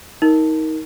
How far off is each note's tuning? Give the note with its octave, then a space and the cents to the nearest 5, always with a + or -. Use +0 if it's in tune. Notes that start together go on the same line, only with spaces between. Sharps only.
D#4 +25 A#4 +0